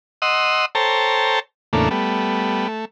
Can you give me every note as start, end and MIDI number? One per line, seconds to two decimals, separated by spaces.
0.22 0.66 75
0.22 0.66 78
0.22 0.66 84
0.22 0.66 87
0.22 0.66 88
0.75 1.40 69
0.75 1.40 72
0.75 1.40 73
0.75 1.40 79
0.75 1.40 81
0.75 1.40 82
1.73 1.89 40
1.73 1.89 45
1.73 1.89 49
1.73 1.89 57
1.73 1.89 58
1.73 1.89 62
1.91 2.68 55
1.91 2.68 57
1.91 2.68 59
2.68 2.85 57